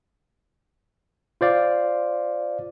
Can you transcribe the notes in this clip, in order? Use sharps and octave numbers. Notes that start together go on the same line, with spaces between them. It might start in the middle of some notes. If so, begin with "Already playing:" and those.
F4 C5 D5 F5